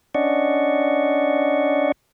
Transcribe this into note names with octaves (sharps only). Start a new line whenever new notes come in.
C#4 D4 D5 D#5 F#5 C#6